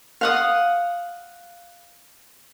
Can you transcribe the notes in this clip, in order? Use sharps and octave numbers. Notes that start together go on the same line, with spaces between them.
F5 F#5 D#6